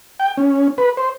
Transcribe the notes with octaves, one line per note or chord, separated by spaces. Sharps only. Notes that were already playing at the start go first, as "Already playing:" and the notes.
G5
C#4
B4
C5